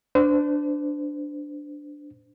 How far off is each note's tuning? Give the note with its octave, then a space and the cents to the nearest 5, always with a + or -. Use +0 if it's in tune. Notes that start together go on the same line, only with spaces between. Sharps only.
D4 +0 C5 -35